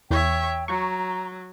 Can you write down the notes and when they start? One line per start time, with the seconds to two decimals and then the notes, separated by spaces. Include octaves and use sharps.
0.11 E2 C#5 E5 G5
0.68 F#3 A#5 C#6